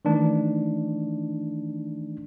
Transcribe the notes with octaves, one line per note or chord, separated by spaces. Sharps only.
D#3 E3 A3 D4 D#4